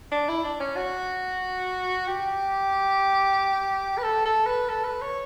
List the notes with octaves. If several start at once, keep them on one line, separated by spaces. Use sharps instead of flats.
D4
E4
D4
C#4
F#4
G4
B4
A4
A4
B4
A4
B4
C#5